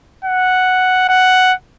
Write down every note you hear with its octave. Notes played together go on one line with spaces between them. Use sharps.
F#5
F#5